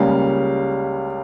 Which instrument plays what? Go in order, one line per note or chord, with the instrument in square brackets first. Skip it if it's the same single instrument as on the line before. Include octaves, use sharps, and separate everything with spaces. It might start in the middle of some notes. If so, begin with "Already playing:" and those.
Already playing: [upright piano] C#2 C#3 G3 A#3 F5